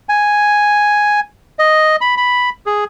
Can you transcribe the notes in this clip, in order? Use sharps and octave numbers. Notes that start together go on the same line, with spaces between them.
G#5
D#5
B5
B5
G#4